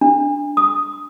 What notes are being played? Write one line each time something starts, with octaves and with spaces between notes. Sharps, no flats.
D4
D#6